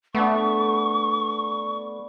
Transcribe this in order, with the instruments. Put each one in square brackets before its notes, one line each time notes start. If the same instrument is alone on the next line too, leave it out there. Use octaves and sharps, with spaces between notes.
[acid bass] A3 [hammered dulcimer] B3 D4 [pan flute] C#6